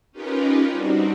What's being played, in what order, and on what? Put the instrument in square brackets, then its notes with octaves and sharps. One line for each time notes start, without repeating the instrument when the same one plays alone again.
[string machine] C#4 D#4 F4 G4 A#4 B4
G3 C4 D4 D#4 F#4